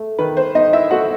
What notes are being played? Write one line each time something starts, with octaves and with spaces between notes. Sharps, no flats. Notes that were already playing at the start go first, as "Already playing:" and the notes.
Already playing: A3
D#3 B4
C5
D#4 D#5
E4 E5
A3 F#4 F#5